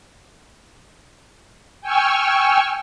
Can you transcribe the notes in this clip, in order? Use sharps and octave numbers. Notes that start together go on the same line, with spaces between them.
G5 G#5 C#6 E6 F6